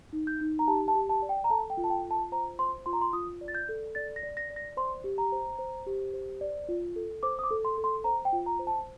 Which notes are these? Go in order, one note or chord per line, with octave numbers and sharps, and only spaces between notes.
D#4
G6
D#4
A#5
G4 A5
A5
G4
A5
D5
G5
A#5
A4 A5
G5
F4
A5
G5
F4
A5
C5 A#5
C5 C6
F4 C6
A#5
C6
F4 D#6
D5
A6
G6
A4
D5 A6
A#6
D5
A#6
D5
A#6
C5 C6
G4
A#5
C5
C5
G4
C5
D5
F4
A4
C5 D6
D#6
D6
A4
C6
A4
C6
C5 A#5
G5
F4
A#5
C5
A5